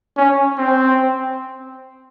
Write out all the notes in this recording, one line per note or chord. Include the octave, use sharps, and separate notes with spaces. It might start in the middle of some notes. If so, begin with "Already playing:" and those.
C#4
C4